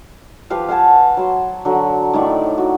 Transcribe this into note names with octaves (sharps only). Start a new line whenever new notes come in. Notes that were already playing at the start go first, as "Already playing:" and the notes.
F3 G4 B4 F5
F5 F#5 G#5 A5
F#3 C6
D3 F#3
A2 D#3 D5 C#6
F#4